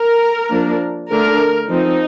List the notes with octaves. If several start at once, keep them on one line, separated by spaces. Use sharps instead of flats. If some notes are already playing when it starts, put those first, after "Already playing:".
Already playing: A#4
F3 A#3 D4
D3 A3 D4 A#4
F3 C4 D#4